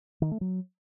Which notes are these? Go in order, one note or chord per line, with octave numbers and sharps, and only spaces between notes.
D#3
A3
F#3